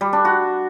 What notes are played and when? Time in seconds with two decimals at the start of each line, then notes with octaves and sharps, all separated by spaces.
0.01 G3
0.13 D4
0.25 F#4